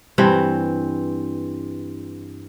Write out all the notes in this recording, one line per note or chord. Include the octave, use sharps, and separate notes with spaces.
G2 E3 C4